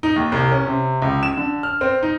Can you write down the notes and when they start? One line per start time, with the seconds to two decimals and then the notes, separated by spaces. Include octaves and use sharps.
0.03 D#4
0.16 D#2
0.32 C2
0.52 C#4
0.66 C3
1.02 C#2
1.23 E7
1.37 D3
1.63 F6
1.81 C4
2.03 D#4